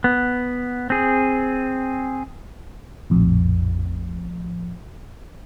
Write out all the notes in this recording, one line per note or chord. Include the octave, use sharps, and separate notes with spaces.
B3
C4 G#4
A#1 F2 A2